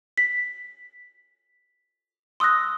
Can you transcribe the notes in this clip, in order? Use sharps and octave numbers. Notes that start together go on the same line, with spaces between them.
B6
C6 D#6 E6 F#6 A#6